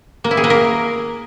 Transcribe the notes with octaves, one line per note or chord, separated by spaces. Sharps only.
A#3
E4
G#4
A#3
A#4